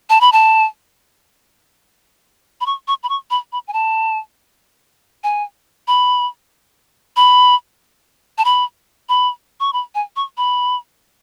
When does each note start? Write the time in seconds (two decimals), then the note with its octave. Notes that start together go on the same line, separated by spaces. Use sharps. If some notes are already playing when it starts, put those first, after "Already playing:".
0.10 A5
0.21 B5
0.32 A5
2.61 B5
2.66 C#6
2.88 C#6
3.03 B5
3.09 C#6
3.31 B5
3.52 B5
3.68 G#5
3.73 A5
5.24 G#5
5.88 B5
7.16 B5
8.38 A5
8.45 B5
9.09 B5
9.60 C#6
9.73 B5
9.95 G#5
10.16 C#6
10.37 B5